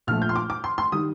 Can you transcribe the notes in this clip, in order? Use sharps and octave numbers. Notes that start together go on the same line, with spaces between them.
A#1 A#2 F3 A3 F6
G6
C6
D6
D6
C6
C6
D#3 G3 D#6